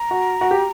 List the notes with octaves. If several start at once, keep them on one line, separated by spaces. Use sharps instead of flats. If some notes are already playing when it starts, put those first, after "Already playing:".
Already playing: A#5
F#4
F#4
G4